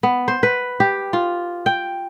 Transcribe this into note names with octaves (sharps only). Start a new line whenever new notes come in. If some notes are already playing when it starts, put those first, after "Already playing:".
B3
C5
B4
G4
F4
G5